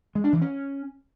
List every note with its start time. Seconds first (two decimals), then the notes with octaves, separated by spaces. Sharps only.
0.15 G#3
0.24 D4
0.33 E3
0.41 C#4